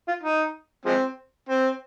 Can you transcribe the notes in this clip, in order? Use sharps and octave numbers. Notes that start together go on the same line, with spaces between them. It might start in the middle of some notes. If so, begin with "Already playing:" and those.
F4
D#4
F3 G#3 C4
C4